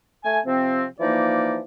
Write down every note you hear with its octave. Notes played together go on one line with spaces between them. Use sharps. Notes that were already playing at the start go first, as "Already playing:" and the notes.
A3 G#5
C3 F3 C4
E3 F3 A#3 D#4 D5